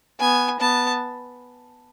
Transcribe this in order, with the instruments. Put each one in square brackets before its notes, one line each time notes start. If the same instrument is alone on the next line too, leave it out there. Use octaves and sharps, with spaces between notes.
[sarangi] B3 [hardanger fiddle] G#5
[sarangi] B3 [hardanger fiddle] A5